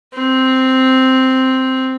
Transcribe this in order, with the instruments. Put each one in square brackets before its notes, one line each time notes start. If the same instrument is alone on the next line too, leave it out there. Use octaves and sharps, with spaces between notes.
[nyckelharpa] C4